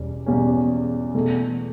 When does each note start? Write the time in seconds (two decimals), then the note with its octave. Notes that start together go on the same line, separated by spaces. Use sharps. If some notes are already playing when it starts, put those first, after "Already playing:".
Already playing: E1 E2 B2 G3 C#4
0.26 E1 E2 B2 G3 C#4
1.14 E2 B2 A3